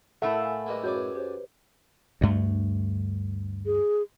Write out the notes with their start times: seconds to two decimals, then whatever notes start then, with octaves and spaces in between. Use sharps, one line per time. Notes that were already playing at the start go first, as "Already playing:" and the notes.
0.22 A2 A3 E4 A4 A#4 E5 F#5
0.41 F5 G#5
0.66 G3 G#3 A#3 A#4 B4 D#5
0.84 F#2 F#4 G#4 A#4 C#5 D5 G6
0.97 B4
1.15 G4 C5 C#5
2.21 D2 G2 A3
3.66 G#4